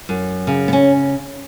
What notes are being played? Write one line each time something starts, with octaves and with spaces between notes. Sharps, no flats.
F#2
C#3
B3
C#4